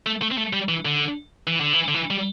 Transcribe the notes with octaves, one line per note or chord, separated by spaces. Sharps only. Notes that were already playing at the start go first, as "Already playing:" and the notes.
A3
A3
C4
A3
G3
E3
D3
E3
D3
E3
D3
E3
G3